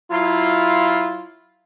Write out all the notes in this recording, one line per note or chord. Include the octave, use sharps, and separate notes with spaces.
F#3 E4 F4